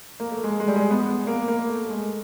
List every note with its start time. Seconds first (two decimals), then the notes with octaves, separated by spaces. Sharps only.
0.20 A#3
0.32 A3
0.44 G#3
0.60 G#3
0.67 G3
0.76 G#3
0.90 B3
1.06 B3
1.27 A#3
1.48 A#3
1.69 A3
1.85 A3
1.90 G#3